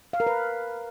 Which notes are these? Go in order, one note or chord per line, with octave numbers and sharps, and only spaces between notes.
F5
A#4
B4